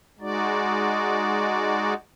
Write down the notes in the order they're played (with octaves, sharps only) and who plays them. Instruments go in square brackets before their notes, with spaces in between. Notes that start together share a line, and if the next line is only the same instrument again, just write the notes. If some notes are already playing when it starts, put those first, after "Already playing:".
[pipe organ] G#3 D#4 F#4 D5